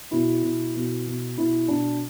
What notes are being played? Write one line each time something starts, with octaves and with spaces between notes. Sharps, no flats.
B2 E4
B2
B2
B2
B2 E4
B2 D4